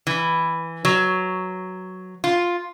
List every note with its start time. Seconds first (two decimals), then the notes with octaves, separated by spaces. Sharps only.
0.07 E3
0.85 F#3
2.24 F4